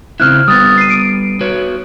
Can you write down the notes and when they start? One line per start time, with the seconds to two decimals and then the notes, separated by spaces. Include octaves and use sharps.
0.20 C#3 C4 E4 F6 F#6
0.48 G3 B3 D#6 A6
0.78 C7 D#7
0.90 D7
1.41 F#4 B4 C#5